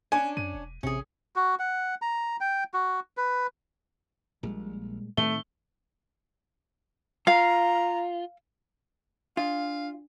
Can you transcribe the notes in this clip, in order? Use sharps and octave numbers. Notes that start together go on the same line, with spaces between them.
C#4 D4 G#5
F#2 D#7
E1
A1 C3 C#4 G#4
F#4
F#5
A#5
G5
F#4
B4
A#1 A#2 G3 G#3
A2 D#3 A3 C4 G7
F4 F5 A#5
D4 F4 F5